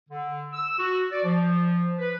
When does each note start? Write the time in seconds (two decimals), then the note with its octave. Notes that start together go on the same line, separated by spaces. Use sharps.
0.10 D3
0.52 E6
0.78 F#4
1.11 D5
1.24 F3
1.99 B4